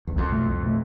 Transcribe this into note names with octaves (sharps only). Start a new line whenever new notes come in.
E2
C2 F2
B2 A3
C2
B2 A3